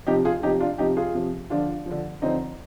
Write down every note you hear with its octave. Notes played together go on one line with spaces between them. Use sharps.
C3 F3 D#4 G4
F4 G#4
C3 F3 D#4 G4
D4 F4
C3 F3 D#4 G4
F4 G#4
C3 F3
D3 F3 D4 F4
D3 F3
D3 F3 C4 D#4